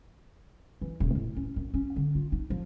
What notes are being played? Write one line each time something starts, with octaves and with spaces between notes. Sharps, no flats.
E3
D#1
A2
C#4
F#2
C#4
D3
F4
D#4
F3